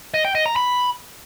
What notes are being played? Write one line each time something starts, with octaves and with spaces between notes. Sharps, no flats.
D#5
G5
D#5
A#5
B5